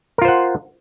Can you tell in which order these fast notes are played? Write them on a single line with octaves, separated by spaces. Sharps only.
A#4 F4 C5 F#5